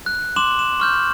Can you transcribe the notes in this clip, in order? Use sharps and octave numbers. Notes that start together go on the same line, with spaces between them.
F#6
C6 D6 E7 F#7
E7
C#6 F6 G6